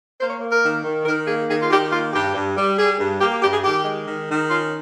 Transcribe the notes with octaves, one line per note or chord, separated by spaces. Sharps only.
A#3 C5
C#5
A#3
A#4
D#3
D#3
D#3 A#4
A#3 G#4
D#3 G#4
F4
D#3 G4
A#3 F4
G2 G4
G2
G3
G3 G#4
G2
A#3 G4
G4
G2 G4
G#4
D#3 G4
G#3
D#3
D#3
C#4 F4